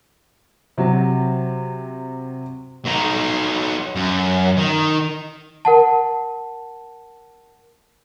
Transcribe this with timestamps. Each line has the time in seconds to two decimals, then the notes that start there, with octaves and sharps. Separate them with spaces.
0.78 C3 F#3
2.85 F#3 D#4
3.96 F#2
4.57 D#3
5.65 A#4 F#5 A5